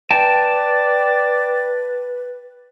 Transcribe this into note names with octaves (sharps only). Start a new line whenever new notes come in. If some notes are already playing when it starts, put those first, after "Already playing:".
B4 D5 G5 A5